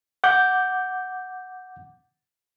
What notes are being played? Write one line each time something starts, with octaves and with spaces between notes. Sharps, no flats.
F#5 D6 G6